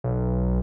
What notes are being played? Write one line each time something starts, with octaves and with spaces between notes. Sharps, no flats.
B1